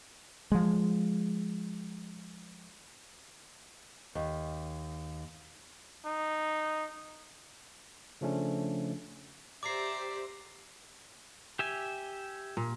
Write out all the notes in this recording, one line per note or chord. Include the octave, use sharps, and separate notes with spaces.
F3 G#3
D#2
D#4
C#3 F3 A3 C#4 D4
G4 C5 D5 E5 A#5 D6 C7
G4 E5 G#5
A#2